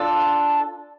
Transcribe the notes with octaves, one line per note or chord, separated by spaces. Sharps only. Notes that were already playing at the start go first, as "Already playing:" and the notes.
Already playing: D4 F4 A4